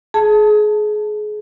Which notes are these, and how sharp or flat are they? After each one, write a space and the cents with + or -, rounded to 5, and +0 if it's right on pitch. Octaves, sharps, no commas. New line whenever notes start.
G#4 +30 A5 +0